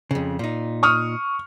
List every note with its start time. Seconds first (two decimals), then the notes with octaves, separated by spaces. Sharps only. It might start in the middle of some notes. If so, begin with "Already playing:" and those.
0.11 F2 C#3
0.39 A#2 D#4
0.83 C#6 D#6 F6